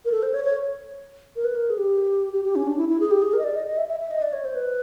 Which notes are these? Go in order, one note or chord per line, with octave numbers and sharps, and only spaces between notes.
A#4
A4
C5
C#5
C#5
A#4
B4
A#4
G#4
G4
G4
G4
C#4
D4
E4
E4
G#4
G4
G#4
A#4
D#5
D5
D#5
D#5
E5
E5
E5
D#5
D5
C#5
C5
B4